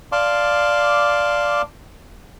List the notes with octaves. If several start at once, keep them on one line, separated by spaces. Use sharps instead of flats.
D5 F5 A5 C6 D6